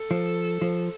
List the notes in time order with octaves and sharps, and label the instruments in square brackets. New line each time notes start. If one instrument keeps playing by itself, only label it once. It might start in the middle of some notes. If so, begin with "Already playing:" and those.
Already playing: [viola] A4
[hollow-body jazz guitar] F3
F3